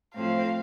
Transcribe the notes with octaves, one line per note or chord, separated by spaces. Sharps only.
A2 F3 C4 F5